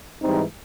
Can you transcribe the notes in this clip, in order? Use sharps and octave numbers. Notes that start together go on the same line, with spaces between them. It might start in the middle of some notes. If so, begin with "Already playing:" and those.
G#2 E3 G3 C4 D#4